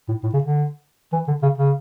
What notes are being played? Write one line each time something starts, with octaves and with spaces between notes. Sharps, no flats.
A2
A2
C#3
D3
E3
D3
C#3
C#3